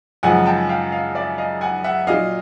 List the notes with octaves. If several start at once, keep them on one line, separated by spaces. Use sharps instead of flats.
F#2 C#3 F3 G#3 F#5 G#5
G5 A5
F5 G5
D#5 F5
D5 E5
D#5 F5
F#5 G#5
E5 F#5
A#2 F#3 D#5 F5